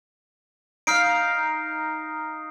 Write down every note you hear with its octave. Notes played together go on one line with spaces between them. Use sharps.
D#4 F5 F6 C7 D7